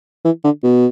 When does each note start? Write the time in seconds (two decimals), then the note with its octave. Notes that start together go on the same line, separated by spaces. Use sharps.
0.25 E3
0.44 D3
0.64 B2